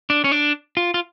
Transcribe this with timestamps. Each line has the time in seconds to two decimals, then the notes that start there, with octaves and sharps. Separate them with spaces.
0.10 D4
0.24 C#4
0.32 D4
0.77 F4
0.94 F4